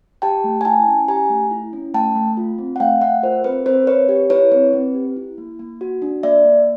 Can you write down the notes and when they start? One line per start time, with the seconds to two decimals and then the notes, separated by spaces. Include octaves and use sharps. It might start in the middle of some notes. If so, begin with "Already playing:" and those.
0.22 G4 G5 A5
0.44 A3
0.61 G#5
0.65 E4 G5 A5
0.87 C#4
1.08 G4 G#5 A#5
1.30 A3
1.51 E4
1.73 C#4
1.94 A3 G5 A5
2.15 A3
2.37 F4
2.58 C4
2.76 F#5
2.80 A3 F5 G5
3.01 A3 E5 F#5
3.23 F4 A#4 C5
3.44 C4 B4
3.66 C4 A#4 C5
3.87 C4 B4 C#5
4.09 G4
4.30 E4 B4 C#5
4.52 C4 B4
4.73 C4
4.94 G4
5.16 E4
5.38 A#3
5.59 A#3
5.81 F#4
6.02 D4
6.23 A#3 D5 E5
6.45 A#3